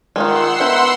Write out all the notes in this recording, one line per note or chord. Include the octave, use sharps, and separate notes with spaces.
D#3 G#3 D#4 F4 F#5 C6 E6
B3 A#4 C5 E5